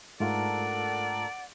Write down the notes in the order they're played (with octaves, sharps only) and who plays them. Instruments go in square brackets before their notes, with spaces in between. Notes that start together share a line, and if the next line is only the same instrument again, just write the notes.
[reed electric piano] G#2 A3 F4 [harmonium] D4 A4 A#4 [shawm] D5 [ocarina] F#5